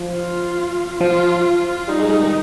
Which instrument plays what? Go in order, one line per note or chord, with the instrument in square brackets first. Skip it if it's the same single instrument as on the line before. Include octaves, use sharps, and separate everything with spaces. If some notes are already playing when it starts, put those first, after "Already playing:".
Already playing: [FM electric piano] F3
[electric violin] F4
[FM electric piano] F3 [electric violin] F4
[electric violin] F4
[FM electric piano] G3 [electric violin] D#4
[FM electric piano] G#3
G#3
D#3